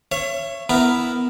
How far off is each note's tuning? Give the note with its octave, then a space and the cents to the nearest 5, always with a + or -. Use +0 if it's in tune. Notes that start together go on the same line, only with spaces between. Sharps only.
C#5 -5 E5 +30
B3 +0 E4 +0 A#4 +0